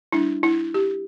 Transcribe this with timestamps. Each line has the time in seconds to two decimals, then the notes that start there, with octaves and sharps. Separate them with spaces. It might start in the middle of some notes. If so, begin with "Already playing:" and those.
0.12 G3 D4 E4
0.43 E4
0.74 G4